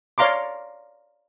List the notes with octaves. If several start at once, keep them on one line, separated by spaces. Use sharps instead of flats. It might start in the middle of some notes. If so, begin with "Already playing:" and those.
C#5 D5 F5 A#5 C6 D6